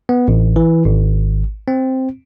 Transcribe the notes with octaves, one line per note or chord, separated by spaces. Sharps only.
B3
A1
E3
G#1
C4